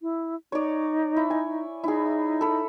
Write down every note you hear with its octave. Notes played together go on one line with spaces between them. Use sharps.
E4
D#4 C#5 D5
E4
G#5
D#4 E4 G#4
A4 B5